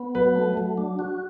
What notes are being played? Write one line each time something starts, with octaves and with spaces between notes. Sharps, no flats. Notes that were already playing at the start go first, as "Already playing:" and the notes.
Already playing: B3
F#3 B4
A3
F#3
D4
F#4